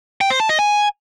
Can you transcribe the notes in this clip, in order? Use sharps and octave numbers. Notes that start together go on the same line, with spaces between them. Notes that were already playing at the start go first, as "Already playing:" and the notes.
G5
C5
A5
D#5
G#5